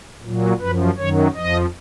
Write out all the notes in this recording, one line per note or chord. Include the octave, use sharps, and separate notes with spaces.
A#2 F#3
F#2 F3 B4
F#2 D#3 F#3 C#5
F2 F3 D#5